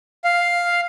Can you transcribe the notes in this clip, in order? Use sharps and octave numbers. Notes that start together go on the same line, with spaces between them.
F5